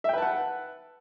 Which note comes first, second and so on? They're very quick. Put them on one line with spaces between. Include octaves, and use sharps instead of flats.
E5 G5 B4 A5 F#5